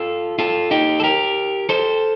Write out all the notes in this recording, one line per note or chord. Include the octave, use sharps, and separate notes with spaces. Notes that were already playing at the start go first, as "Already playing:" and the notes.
Already playing: F4 A4
F4 A4
D#4 G4
A4
G4 A#4
A4 C5